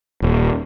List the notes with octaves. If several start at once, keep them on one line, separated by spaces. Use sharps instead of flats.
D#1